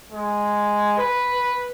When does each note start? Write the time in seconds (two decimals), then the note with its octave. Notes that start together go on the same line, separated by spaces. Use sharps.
0.12 G#3
0.98 B4